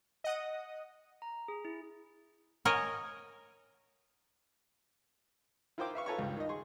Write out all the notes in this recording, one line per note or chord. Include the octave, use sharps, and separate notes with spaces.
D#5 F#5 D#6
A#5
G#4
E4
A#4 C#5 D#5 G#5
E4 F4 A#4 C5 G5 D6
B4 E5 F5 C#6
F4 A4 B4 C#5 A#5 C#6
C#2 G2
D#3 D#5
G#4 C6 C#6